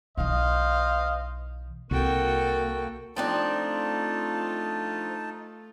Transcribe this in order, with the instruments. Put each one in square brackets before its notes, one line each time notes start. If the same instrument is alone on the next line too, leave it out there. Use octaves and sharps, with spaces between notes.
[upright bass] B1 E3 [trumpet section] C5 D#5 F5
[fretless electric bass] C2 [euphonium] A#3 [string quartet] F#4 A4 G5
[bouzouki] F3 C4 D4 [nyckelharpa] A3 F4 [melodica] D#4 A5